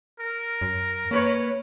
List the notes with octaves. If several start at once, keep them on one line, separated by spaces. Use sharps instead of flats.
A#4
F#2
A#3 C#4 B4 C#5